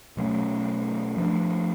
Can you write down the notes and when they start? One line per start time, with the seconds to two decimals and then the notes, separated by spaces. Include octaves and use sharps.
0.17 B2 F#3 A3 C#4
1.17 F3 A3 D4